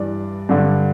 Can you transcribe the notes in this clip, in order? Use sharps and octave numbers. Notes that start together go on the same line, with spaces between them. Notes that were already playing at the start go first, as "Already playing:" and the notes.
Already playing: G2 E3 D5
G2 D3